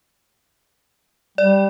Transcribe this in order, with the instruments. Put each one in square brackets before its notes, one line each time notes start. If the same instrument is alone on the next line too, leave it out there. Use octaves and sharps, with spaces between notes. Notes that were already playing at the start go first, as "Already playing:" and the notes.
[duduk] G3 [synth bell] D5